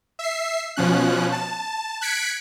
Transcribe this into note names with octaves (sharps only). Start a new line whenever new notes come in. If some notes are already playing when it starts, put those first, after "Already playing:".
E5 C7
B2 F3 C#4 F#6
A5
F#6 G#6 B6 C#7 D7